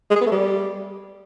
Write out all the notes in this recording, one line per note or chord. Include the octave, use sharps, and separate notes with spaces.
G#3
G#4
B3
A3
G3